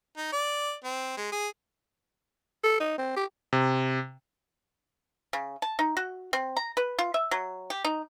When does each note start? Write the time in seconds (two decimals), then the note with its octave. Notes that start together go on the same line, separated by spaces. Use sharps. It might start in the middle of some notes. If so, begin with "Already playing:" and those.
0.17 D#4
0.33 D5
0.84 C4
1.17 G#3
1.32 G#4
2.64 A4
2.80 D#4
2.98 C4
3.16 G4
3.53 C3
5.33 C#3
5.62 A5
5.79 D#4
5.97 F#4
6.33 C4
6.57 A#5
6.77 B4
6.99 F4
7.14 E5
7.31 F#3
7.70 G4
7.85 D#4